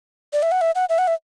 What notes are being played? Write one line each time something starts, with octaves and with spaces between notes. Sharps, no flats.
D5
E5
F#5
E5
F#5
E5
F#5
E5